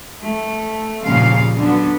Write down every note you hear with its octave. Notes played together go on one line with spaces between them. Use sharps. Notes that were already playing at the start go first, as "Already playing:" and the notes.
A3
D#2 A#2 C#3 F3 F5
D3 F#3 B3